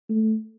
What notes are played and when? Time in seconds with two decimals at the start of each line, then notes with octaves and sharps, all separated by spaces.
0.09 A3